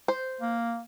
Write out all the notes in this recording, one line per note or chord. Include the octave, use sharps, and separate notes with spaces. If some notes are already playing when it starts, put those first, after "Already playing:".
C5
A#3